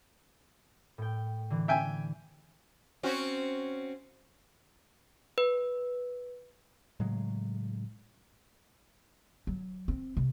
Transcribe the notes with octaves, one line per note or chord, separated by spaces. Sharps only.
A2 G5
D3 E3
E5 G5 G#5
C4 C#4 F#4
B4
A2 C#3 F#3 G#3
F#3
C4
C3